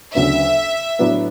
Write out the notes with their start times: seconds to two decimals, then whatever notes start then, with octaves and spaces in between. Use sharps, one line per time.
0.15 D2 C#3 F#3 B3 D4 E5
0.99 A2 F#3 B3 D4